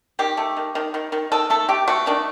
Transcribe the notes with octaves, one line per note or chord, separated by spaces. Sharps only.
D#3 G4
A3
D#3
D#3
D#3
D#3
D#3 A4
A3 A4
A3 G4
A3 F#4
D#3 D4